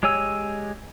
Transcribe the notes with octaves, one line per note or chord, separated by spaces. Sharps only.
G#3 G4 C#5 G#5 E6